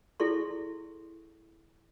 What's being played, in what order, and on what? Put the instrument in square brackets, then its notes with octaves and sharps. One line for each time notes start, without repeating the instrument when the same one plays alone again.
[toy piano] E4 G#4 A4 D5 C6 C#6